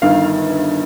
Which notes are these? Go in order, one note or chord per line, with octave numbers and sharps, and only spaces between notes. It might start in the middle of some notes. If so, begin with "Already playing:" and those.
G1 G2 D#3 F5